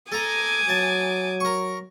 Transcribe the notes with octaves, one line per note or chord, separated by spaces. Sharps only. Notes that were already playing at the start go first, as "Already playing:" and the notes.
A4 G#5 A#5 D6 D#6
F#3 A5
A#4 C#6